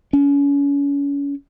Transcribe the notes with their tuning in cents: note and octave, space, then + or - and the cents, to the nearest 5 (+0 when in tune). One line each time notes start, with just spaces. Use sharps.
C#4 +35